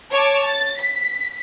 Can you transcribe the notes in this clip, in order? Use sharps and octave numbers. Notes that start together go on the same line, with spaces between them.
C#5 A5 D6
A6
B6